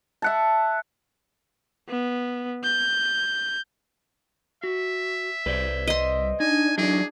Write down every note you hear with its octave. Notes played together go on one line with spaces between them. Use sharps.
E5 F#5 A5
B3
G6
F#4 E5
C2 B4 C5 D5
D#5 C6
D4 D#4 G#5
F#3 D#4 E4 G#4